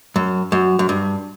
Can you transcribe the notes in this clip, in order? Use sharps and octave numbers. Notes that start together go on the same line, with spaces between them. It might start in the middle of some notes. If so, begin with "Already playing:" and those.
F#2
F#2
F#2
G2